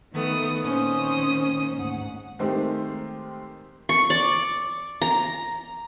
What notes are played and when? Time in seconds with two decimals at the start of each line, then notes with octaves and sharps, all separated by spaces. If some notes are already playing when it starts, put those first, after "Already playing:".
0.11 D#3 A3 B3 D#6
0.60 A#2 D#3 C4 C#4 C5 D#6
1.74 D2 G#2 F#5
2.39 D#3 G#3 A3 C4 G4 A#4
3.89 C#6
4.10 D5
5.02 A#5